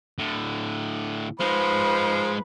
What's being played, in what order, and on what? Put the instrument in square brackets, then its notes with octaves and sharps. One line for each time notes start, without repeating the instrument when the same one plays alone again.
[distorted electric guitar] A2 D3
[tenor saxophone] F3 [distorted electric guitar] G#3 D#4 [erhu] B4